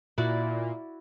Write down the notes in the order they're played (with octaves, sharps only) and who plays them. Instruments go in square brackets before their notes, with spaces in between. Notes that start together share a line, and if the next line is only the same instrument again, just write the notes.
[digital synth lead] A#2 [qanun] E4 F#4 D5